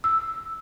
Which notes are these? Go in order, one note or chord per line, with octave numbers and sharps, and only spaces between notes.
E6